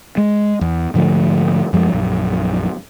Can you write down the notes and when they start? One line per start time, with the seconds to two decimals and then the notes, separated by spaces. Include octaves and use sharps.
0.17 G#3
0.61 E2
0.94 G#2 D3 F3 A3
1.73 F#2 F3 G#3
1.93 A#1 F#2